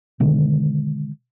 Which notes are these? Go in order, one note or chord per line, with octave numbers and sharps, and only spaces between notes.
B2 D3 D#3 G#3